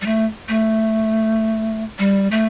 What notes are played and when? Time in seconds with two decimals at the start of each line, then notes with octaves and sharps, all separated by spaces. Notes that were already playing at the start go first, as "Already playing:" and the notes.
0.01 G3
0.06 A3
0.49 A3
1.99 G3
2.31 A3